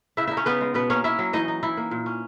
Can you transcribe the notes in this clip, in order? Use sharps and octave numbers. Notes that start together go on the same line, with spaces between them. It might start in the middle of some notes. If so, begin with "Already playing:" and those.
C#3 E4 E5
D#4 E4 E5
C#4 C#5
C#3 B3 B4
G#3
B2 B3 B4
A#3 C#4 C#5
C#4 E4 E5
F#3
E3 D#4 D#5
D#4
E3 E4
A#3
A#2
C#4